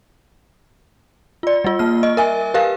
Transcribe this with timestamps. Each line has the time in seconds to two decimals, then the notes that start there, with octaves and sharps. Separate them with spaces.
1.43 F4 D5
1.64 G3 F4
1.79 A#3 F6
2.03 D#5
2.17 A#4 E5 G#5
2.54 G4 A#4 B4 F5